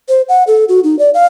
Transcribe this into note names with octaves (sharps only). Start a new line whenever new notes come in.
C5
F#5
A4
F#4
D#4
D5
F5